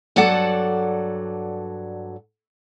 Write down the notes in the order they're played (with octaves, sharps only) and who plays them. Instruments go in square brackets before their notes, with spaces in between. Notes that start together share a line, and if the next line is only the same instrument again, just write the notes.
[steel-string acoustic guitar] G2 F#3 A4 D5 F#5 A5